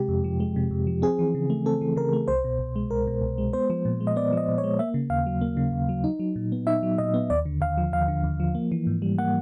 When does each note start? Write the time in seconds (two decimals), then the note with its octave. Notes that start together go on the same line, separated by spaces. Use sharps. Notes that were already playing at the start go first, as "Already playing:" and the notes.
Already playing: C3 G#3 G4
0.08 F2
0.24 F3
0.40 G#3
0.56 C3
0.71 F2
0.87 F3
1.02 C4 G#4
1.19 E3
1.35 C#3
1.50 A3
1.66 C4 A4
1.81 E3
1.96 C#3 A#4
2.13 A3
2.28 C2 C5
2.44 B2
2.59 C2
2.76 G#3
2.91 C2 A#4
3.07 B2
3.22 C2
3.38 G#3
3.53 B3 C5
3.70 F3
3.85 A#2
4.00 G#3
4.07 D#5
4.16 B3 D5
4.32 F3 D#5
4.48 A#2
4.58 C#5
4.64 G#3
4.79 A#3 E5
4.94 C#3
5.10 D#2 F5
5.26 F#3
5.41 A#3
5.57 C#3
5.73 D#2
5.89 F#3
6.04 D#4
6.20 F#3
6.36 A#2
6.52 B3
6.67 D#4 E5
6.83 F#3
6.98 A#2 D#5
7.14 B3
7.30 D#2 D5
7.46 D3
7.61 D#2 F5
7.78 F3
7.93 D#2 F5
8.08 D3
8.24 D#2
8.40 F3
8.55 A#3
8.72 E3
8.87 G#2
9.02 G3
9.18 A#3 F#5